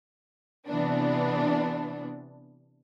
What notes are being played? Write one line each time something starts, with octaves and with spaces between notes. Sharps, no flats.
C3 E3 B3 D4